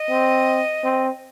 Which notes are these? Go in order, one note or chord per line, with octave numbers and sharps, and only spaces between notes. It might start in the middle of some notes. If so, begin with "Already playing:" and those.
Already playing: D#5
C4
C4